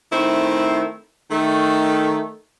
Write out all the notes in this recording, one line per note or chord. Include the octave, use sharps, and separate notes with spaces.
D#3 A3 C4 E4
D#3 A3